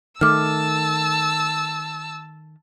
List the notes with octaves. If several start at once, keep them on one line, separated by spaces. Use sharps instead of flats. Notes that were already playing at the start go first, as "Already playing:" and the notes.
D#3 A3 A5 D6 E6 F6